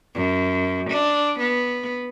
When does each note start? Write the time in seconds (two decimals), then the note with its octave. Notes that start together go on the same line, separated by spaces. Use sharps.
0.15 F#2
0.91 D4
1.40 B3